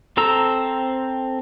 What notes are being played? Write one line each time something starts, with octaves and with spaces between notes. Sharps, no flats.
C4 A4 A#5 E6